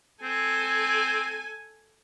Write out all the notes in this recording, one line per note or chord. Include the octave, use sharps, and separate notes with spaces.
C4 A4 G#5